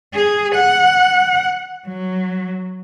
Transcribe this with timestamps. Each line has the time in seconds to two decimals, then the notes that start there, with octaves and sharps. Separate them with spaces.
0.14 G#4
0.55 F#5
1.87 F#3